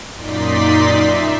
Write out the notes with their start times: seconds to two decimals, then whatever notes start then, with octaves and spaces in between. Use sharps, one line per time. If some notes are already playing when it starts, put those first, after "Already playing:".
0.15 F#2 A#2 D#4 D5 C6 B6
0.96 E5